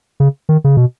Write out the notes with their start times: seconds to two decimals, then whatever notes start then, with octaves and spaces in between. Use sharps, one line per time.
0.20 C#3
0.49 D#3
0.64 C#3
0.77 B2